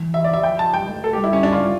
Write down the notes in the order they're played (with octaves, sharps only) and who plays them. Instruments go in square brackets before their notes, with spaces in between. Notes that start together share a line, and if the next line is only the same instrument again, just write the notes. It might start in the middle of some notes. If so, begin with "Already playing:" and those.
Already playing: [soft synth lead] E3
[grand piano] E5
D5
E5
[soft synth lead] F3 [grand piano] G5
[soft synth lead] F3 [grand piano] A5
[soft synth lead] G3 [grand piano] G5
[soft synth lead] A3
[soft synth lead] A3 [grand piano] A4
[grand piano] G4
[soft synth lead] G3
[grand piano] E4
C#4
D4
F4
[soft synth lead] G3